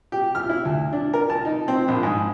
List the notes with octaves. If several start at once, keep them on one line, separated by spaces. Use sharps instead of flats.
G4
F6
E4
D2
D4
A#4
A5
D#4
C4
A#1
G#2